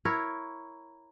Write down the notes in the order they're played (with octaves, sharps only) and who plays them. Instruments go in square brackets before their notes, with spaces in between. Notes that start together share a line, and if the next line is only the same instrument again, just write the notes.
[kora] E4 A#4 C#5